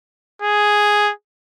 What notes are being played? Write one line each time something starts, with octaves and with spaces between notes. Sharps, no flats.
G#4